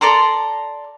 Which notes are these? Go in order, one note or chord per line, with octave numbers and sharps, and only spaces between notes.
A4 D5 A#5 C6